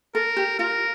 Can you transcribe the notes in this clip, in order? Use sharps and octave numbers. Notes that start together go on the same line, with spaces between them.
A4 A#4
G4
F4 A#4